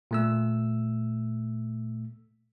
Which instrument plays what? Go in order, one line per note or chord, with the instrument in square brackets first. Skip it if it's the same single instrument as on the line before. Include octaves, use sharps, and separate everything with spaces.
[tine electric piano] A#2 A3 E6